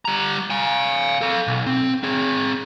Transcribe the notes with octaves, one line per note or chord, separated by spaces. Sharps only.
G3 A#5
F5 G#5
A4 F5
B1
C4
C4 G#4